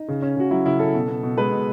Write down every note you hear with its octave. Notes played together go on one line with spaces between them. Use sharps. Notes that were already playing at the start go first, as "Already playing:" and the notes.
Already playing: D#4
C#3
C#4
C#3 F#4
F#3 E4
C#3 E4
C#4 A4
B2
B3
B2
G#3 B4
B2